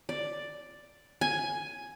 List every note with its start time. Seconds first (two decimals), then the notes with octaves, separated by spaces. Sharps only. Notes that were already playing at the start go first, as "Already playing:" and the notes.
0.09 D5
1.21 G#5